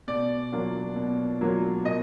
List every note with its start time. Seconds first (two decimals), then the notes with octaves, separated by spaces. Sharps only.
0.07 B2 D5
0.52 F#3 A#3 D4 F4
0.96 B2
1.41 F#3 A#3 D4 F4
1.85 B2 D#5